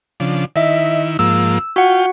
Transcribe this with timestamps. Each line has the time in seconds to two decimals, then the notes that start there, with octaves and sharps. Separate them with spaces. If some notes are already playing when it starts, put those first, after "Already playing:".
0.20 C#3 F3 D4
0.56 D#3 E4 D#5 E5
1.19 G#2 F3 A#3 E6
1.76 F4 F#4 F#5 G5